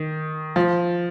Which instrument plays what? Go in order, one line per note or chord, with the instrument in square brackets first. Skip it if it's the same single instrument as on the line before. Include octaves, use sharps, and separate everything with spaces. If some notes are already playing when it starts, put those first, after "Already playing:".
Already playing: [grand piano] D#3
F3